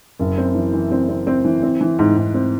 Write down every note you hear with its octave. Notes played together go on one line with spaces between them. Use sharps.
F#1
C4
E3
E3
C4
C4
C4
E3
C4
E3
G#2
G#2
C4